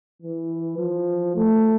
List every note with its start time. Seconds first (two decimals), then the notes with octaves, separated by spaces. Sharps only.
0.22 E3
0.78 F3
1.36 A3